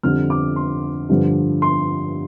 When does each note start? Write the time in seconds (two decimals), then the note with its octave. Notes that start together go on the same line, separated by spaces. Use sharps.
0.03 F2 D3 G3 F6
0.30 D6
0.56 C6
1.09 G2 D3 F3
1.62 C6